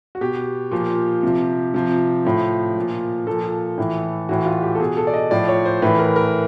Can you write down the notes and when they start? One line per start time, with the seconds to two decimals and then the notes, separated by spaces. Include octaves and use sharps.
0.15 F#4
0.21 B2 G4
0.71 A#2 F3
1.23 C3 F3
1.74 C3 F3
2.25 A2 F3
2.76 A#2 F3
3.26 A#2 F3 A4
3.78 A2 E3
4.29 A2 E3 F#4
4.46 F4
4.63 G4
4.75 A4
4.80 B2 G#4
4.97 A4
5.07 D5
5.14 D#5
5.31 A2 F3 D5
5.48 C#5
5.65 C5
5.82 A2 E3 B4
5.99 A#4
6.16 A#4